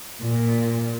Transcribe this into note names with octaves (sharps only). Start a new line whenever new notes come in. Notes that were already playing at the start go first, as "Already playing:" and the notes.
A#2